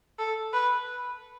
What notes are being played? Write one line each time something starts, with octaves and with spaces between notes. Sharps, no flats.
A4
B4